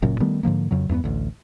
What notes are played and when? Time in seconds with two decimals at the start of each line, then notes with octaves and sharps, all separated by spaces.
0.02 F#1 F#2 A#2 C#3
0.20 D#3 G3 A3 B3
0.43 G#2 D3 F3 A#3
0.71 F2 C#3 F#3
0.89 E2 G2 A#3 B3
1.04 A1 D2